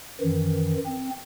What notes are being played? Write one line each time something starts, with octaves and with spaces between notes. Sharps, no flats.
F#2 D#3 E3
C4